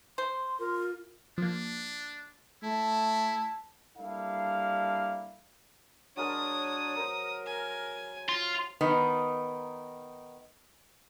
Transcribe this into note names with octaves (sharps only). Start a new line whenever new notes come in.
C5 C6
F4 A#4
F3 A#3 D4
A3 E4 A5
G3 A#3 D4 E4 A4 F5
F#3 G#3 D4 A#4 C#5 D5 D#6
A#4 C5 A#5
G#5
F4
D#3 B3 D#4